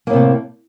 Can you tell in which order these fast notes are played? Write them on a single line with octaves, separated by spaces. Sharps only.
A#3 A2 C3 A3